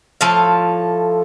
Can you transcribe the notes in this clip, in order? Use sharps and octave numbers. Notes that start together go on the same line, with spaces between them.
A2 F3 A4 F5